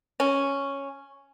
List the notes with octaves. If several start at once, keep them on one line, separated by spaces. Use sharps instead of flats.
C#4